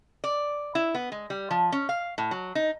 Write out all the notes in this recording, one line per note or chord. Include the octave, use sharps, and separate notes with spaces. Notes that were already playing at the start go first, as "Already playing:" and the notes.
D5
E4
B3
G#3
G3
F3
C#4
F5
A2
F#3
D#4